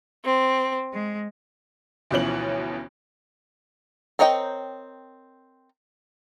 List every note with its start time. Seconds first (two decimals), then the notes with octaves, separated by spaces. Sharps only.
0.24 C4
0.92 G#3
2.11 D2 B2 E3 F3 C#4 F#7
4.19 C4 A#4 C#5 D#5 G5